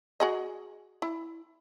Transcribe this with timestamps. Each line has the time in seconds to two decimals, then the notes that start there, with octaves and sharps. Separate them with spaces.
0.20 F#4 G#4 D#5
1.02 E4